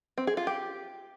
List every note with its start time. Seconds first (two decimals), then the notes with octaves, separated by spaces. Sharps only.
0.18 C4
0.27 G#4
0.37 F4
0.47 G4